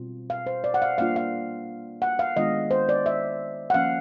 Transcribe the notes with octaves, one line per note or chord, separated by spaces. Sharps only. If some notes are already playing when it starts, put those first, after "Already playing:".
Already playing: B2 G3 C4 F4
F5
C5
D5
F#5
F5
G3 A#3 D4 F4 F5
F5
F#5
F5
D#3 G#3 B3 D4 F4 D#5
C5
D5
E5
F#5
F3 A#3 C#4 F5